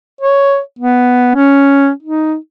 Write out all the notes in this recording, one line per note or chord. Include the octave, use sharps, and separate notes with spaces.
C#5
B3
C#4
D#4